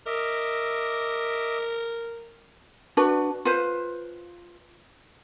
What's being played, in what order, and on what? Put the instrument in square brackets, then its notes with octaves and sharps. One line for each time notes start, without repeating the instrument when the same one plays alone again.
[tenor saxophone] A#4 [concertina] D#5 E5 D6
[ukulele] D4 F#4 B4
F4 B4 C5